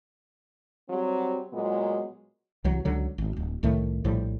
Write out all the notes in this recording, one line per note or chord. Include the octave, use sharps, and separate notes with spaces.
F#3 G3 C4
A#2 F#3 G#3 B3
C2 E3 F#3
C#2 D3 F#3
G#1
D1
C2 A2 D#3 A3
A#1 A2 F3 G3